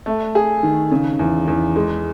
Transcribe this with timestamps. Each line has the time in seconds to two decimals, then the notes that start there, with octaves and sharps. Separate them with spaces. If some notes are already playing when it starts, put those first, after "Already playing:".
0.06 A3
0.35 G#4
0.63 D#3
0.91 C#3
1.19 E2
1.47 E2
1.76 G#3